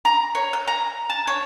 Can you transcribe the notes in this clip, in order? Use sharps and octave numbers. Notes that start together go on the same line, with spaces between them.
A#5
C#5
G6
A#5
A5
C#5